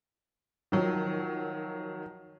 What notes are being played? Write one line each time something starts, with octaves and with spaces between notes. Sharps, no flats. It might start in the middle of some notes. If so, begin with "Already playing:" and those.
D#3 F3 F#3